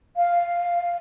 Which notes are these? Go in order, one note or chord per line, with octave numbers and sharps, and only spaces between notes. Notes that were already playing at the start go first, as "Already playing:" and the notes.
F5